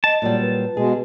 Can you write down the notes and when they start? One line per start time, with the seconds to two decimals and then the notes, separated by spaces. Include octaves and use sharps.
0.04 D#5 A5
0.22 A#2 F#3 G3 D5
0.41 B4
0.77 B2 G#3 G#4